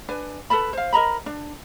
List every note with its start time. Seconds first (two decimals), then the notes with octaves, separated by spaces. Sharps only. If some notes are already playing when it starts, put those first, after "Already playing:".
0.09 D4 B4 G#5
0.50 A4 B4 A5 B5
0.73 C5 F5
0.93 A#4 D#5 A#5 B5
1.26 D4